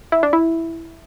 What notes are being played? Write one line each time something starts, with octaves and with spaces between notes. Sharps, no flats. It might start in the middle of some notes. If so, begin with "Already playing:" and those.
E4
D4
E4